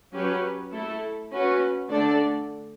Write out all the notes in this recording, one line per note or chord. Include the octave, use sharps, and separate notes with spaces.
F#3 C#4 G4 B4
A3 E4 A4
C#4 F#4 B4
D3 A3 D4 A4 D5